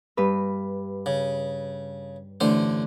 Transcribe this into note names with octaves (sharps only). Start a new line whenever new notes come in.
G2 B4
C#3
A1 D3 A3 C5